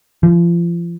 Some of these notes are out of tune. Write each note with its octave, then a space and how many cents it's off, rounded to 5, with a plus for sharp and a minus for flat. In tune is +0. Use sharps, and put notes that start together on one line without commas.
F3 -35